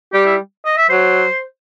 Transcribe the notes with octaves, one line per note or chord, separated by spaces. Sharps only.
G3 G4
E4
D#5
E5
F#3 C5